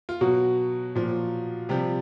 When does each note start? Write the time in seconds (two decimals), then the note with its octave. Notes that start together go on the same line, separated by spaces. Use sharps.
0.09 F4
0.21 B2 F#3 F#4
0.95 A#2 F3
1.69 C3 F3 G3 G4